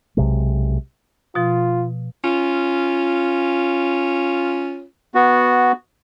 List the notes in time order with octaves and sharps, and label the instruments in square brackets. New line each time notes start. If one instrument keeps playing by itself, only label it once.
[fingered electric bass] B1 C3 G#3
[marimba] B2 F3 [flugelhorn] F4
[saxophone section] C#4 F4
[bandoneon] B3 F#4